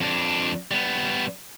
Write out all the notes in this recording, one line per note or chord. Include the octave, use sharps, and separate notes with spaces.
F2 D4
G3 B3